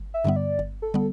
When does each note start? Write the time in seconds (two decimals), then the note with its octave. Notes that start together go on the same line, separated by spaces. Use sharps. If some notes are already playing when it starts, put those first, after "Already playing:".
Already playing: G1
0.14 E5
0.24 G2 D3 G3 B3
0.36 D5
0.59 G1
0.82 A4
0.94 D3 G3 B3